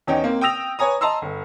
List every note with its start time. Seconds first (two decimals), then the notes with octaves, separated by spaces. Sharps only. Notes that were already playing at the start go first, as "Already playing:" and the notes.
0.07 E2 C#4 D#4 G5
0.24 A#3 C4
0.41 G5 D#6 E6 A#6 F7
0.79 B4 C#5 G#5 A#5 D#6
1.01 D#5 A5 A#5 C6 E6
1.22 G1